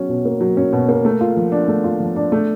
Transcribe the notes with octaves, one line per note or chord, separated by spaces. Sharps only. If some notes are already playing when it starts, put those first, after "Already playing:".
Already playing: F#3 C#4
B2
A#3
F#3
C#4
B2
A#3
A3
F4
F3
D4
A3
F4
F3
D4
A3